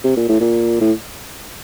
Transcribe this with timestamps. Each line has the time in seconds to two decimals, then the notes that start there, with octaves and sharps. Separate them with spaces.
0.04 C3
0.16 A#2
0.29 A2
0.40 A#2
0.81 A2